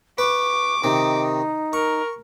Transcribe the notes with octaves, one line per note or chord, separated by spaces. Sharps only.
B4 C#6 D6
C3 D#3 D#4
A#4 C#6